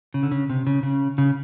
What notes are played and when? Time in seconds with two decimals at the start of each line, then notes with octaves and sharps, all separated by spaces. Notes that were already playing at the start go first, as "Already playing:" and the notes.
0.14 C#3
0.23 D3
0.31 C#3
0.50 C3
0.67 C#3
0.83 C#3
1.18 C#3